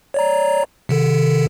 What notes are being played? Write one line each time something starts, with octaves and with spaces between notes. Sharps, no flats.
C#5 D5 A#5
C3 D#3 A4